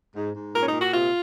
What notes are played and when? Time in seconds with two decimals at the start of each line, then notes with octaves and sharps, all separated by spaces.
0.16 G#2
0.35 G#2
0.54 A#2 A#4
0.63 C#4
0.67 D#4
0.73 A#2
0.80 F#4
0.93 C3 F4